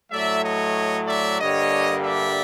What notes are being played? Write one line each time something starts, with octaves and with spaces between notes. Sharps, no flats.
A2 F#3 A3 D5 E5
C#5 D#5
D5 E5
G2 D3 G3 A#3 C#5 D#5
D5 E5